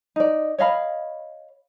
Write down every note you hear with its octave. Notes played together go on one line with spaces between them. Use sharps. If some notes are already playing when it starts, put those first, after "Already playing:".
D#4 D5
C#5 D#5 F5 B5